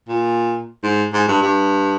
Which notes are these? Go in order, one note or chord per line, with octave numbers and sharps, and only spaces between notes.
A#2
G#2
G#2
G2
G2